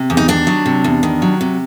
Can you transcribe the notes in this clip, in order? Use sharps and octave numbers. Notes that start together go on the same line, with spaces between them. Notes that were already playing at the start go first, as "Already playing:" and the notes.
Already playing: C3
E2
D#4
D#3 D4
F#3
C3
E2
D#3
F#3
C3